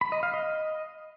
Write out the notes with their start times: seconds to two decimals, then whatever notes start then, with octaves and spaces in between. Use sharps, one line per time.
0.01 B5
0.12 D#5
0.23 F5
0.34 D#5